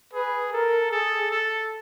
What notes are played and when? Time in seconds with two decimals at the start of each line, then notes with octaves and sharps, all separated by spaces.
0.13 G#4 B4
0.52 A4 A#4
0.92 G#4 A4
1.31 A4